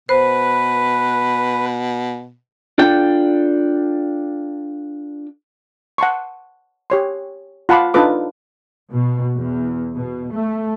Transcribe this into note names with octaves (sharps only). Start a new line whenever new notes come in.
B2 B4 C5
D4 F4 A4 D5 G5
F#5 A5 C6 C#6
G4 C#5 C6
F4 F#5 A5 B5 C6 D6
D4 D#4 F4 A4 B4 D6
B2
E2
B2
A3